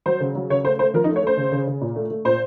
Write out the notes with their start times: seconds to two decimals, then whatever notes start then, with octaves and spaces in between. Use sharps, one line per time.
0.06 F#3 C5
0.20 C#3
0.35 F#3
0.50 C#3 C#5
0.64 A3 C5
0.79 A3 C5
0.94 F3 A#4
1.04 D#4
1.09 A3
1.16 C#5
1.22 A3 C5
1.37 C#3
1.52 C#3
1.67 C#3
1.81 A#2
1.96 A3
2.10 A3
2.25 A#2 C5